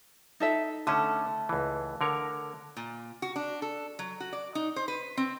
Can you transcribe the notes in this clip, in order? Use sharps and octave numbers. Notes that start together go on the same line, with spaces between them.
D#4 A4 E5
D3 A3 C#4
C#2 E3
D3 A#4 C#5
A#2
F#4
D4
A4
F#3
F#4
D5
D#4
C5
B4
C4